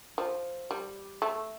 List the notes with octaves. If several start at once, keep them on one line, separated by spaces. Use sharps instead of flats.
F3
G3
A3